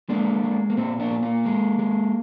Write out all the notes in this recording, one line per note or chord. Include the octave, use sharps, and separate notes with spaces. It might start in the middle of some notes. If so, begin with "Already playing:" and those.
G#3 A#3 D4
G#3
A#3
A#2 C4
A#3 D4
A#2
A#3
G#3
G#3